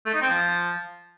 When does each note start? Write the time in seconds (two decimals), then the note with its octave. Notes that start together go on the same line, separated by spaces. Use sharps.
0.06 A3
0.14 D#4
0.22 C4
0.30 F3